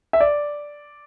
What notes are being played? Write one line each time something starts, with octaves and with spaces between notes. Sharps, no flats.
E5
D5